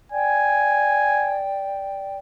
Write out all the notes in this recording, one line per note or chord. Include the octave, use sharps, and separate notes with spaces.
D5 G5 G#5